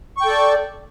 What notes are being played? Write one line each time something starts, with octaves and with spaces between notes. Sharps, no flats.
A4 D5 G5 C#6